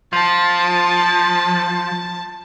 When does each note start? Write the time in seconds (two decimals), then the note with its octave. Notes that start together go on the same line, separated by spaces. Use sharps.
0.13 F3 A5